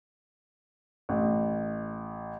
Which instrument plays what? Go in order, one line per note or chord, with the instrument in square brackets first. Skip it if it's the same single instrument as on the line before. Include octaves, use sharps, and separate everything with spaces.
[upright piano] A1